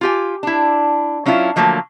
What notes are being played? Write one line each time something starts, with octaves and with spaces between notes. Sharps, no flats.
F4 G4 G#5
D4 E4
F#3 C#4 D4 E4 F4
D3 F3 F#3 A3 A#3